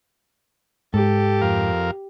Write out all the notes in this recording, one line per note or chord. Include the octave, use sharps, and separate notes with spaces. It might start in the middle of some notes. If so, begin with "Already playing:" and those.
G#2 G4 A4
F2 A#4 F5